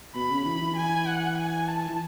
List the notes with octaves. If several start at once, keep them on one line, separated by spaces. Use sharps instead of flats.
B2 B5
C#3
E3 B5
E3
G#5
F#5
G#5
A5
E3